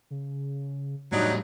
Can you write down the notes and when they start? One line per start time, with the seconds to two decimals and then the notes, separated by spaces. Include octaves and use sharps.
0.11 C#3
1.13 A2 F#3 G3 D4 D#4